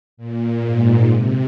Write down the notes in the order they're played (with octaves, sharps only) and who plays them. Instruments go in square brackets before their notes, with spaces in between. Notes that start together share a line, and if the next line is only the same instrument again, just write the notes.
[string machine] A#2
G#2
C3